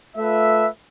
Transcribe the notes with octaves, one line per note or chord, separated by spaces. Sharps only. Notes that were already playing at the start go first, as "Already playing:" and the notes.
A3 F4 A4 B4 E5